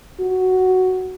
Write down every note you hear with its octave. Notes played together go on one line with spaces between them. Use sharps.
F#4